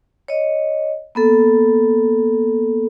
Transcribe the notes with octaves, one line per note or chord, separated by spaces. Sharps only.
C#5 D#5
A#3 B3 A4